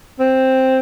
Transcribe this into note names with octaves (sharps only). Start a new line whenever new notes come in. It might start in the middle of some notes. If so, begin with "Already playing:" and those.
C4